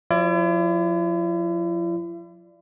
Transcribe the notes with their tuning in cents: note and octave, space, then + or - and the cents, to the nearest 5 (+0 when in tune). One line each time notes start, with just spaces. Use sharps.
F3 +35 E4 +40 D5 +0